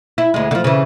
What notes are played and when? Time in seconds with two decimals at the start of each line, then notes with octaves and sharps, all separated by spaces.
0.18 E4
0.34 D2 G#3
0.51 D3 F3
0.64 C#3 E3